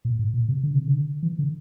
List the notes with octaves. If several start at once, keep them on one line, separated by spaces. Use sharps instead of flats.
A#2
A2
A#2
C3
D3
C3
D3
E3
D3